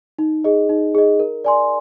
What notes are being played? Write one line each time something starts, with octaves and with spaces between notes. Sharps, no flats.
D#4
G#4 D#5
D#4
G#4 D#5
A#4
D5 G#5 C6